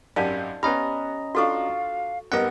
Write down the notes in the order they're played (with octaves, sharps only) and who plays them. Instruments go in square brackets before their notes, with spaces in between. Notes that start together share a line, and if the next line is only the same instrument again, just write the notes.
[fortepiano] G#1 F#2 G4 [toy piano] D5 F5 A5
[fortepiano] B3 F6 [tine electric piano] C#4 D#5 A#5 [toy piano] G4 B5
[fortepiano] D4 F4 C6 [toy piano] F#4 A4 C#6 [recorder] F5
[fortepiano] G#1 G3 D#5 [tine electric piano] B3 F#5 [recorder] A#4